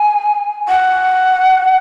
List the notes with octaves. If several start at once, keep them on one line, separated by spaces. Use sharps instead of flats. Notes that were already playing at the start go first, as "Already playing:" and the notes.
Already playing: G#5
F#5